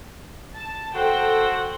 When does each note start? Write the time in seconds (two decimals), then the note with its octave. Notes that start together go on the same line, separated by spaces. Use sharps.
0.57 A5
0.96 F#4 A4 C5 G5